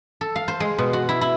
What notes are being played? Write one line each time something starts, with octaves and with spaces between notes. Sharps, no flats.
A4
F5
C5
G#3
B2
F#4
E4
E4